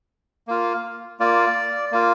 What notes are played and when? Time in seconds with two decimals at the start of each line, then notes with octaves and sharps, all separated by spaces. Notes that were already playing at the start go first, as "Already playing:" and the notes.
0.48 A#3 F4
1.20 A#3 F4 D5
1.92 A#3 F4